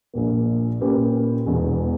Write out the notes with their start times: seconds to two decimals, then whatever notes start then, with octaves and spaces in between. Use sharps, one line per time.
0.14 A#1 A#2 A#3
0.81 A#2 A#3 C#4 G4 B4
1.46 E1 E2 B2